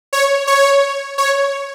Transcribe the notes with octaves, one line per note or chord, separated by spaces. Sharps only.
C#5
C#5
C#5